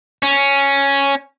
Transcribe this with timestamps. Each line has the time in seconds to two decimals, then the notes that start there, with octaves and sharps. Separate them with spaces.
0.23 C#4